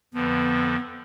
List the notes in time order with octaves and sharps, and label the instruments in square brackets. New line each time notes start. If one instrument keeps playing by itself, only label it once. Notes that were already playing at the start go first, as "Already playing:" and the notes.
[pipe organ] F2 D3 F3 [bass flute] B3